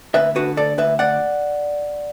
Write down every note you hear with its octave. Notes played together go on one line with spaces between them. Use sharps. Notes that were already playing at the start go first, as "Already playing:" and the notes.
D2 B4 E5
D3 F#4 B4
D2 A4 D5
D2 B4 E5
D2 D5 F#5